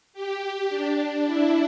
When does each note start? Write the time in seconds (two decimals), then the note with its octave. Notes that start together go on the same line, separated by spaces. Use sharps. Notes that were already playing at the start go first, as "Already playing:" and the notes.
0.13 G4
0.69 D4
1.26 E4